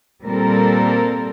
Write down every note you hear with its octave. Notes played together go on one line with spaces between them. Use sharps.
A#2 G3 C4 A4 A#4